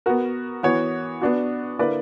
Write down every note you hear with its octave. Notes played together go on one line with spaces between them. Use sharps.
B3 F#4 A#4
E3 B3 F#4 C#5
B3 D4 F#4
D3 A#3 E4 B4 D5